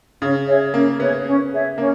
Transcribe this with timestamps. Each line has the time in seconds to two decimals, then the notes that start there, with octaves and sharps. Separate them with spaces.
0.21 C#3 C#4
0.47 G#4 C#5 E5
0.74 A#3 C#4
1.00 B3 G#4 C#5 E5
1.26 C#4
1.51 G#4 C#5 E5
1.78 A#3 C#4